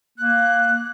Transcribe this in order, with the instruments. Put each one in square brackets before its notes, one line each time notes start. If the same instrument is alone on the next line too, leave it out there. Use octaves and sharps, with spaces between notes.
[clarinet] A#3 [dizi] F#6